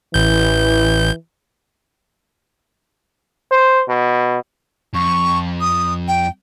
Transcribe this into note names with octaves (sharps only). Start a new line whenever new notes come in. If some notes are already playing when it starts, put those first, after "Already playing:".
A1 E3 G6
C5
B2
F2 C#6
D#6
G5